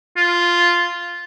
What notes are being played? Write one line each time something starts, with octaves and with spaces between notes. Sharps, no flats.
F4